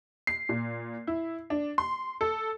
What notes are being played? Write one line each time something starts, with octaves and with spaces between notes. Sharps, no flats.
C7
A#2
E4
D4
C6
A4